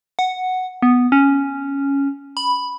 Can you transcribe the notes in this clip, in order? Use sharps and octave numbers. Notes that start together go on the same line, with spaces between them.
F#5
B3
C#4
B5